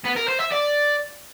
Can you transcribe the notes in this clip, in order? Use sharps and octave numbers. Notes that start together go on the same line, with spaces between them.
B3
A#4
C5
E5
D5